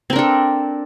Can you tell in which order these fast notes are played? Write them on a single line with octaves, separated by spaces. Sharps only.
C4 A#4 D4 A4